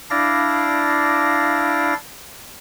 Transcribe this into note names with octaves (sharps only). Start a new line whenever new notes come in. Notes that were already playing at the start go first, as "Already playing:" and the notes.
D4 E4 D5 F5 A#6